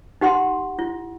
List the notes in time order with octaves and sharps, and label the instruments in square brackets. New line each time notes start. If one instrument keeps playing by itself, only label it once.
[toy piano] D#4 G4 F#5 C6
E4